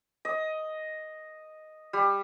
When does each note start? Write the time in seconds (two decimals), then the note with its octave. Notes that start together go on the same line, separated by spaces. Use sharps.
0.25 D#5
1.93 G3